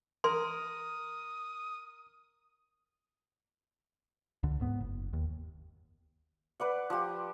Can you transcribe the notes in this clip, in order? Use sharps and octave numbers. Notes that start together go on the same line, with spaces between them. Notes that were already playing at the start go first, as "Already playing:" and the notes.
A#4 C6 D#6
C#2 D3
D1 G#2 B3
F#1
D#2
B4 D5 F#5
F3 G4